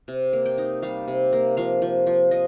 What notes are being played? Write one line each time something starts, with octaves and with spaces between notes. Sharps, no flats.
C3
A#3
G5
D#4
G3 F5
C3
A#3
F3 F5
F3
F3
F3 D#5